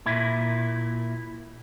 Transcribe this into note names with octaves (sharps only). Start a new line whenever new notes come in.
A#2 E4